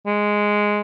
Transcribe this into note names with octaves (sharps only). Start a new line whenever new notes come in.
G#3